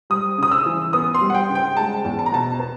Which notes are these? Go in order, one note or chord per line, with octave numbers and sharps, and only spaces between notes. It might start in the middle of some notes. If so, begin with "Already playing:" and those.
G3 D#6
C#3 D#6
E6
E3
B3 D#6
C6
G3
F#5
G5
C#3
G5
G#3 A5
E2
A5
A#5
B2 A5
B3